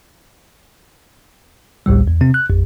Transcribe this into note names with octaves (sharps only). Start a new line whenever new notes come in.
A1 D2 A2 G3
E2
C3 C4
F#6
A1 F2